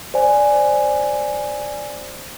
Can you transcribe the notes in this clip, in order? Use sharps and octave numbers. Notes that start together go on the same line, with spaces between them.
C5 D5 G#5